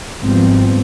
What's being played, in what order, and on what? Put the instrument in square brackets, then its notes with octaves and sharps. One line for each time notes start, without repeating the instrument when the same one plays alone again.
[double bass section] G#1 F3 G3 B3 C4